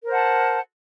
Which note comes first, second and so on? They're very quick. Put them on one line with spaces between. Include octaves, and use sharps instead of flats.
A#4 C5 F#5 A5